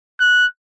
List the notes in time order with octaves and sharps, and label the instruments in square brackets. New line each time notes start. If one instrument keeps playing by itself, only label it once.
[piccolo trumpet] F#6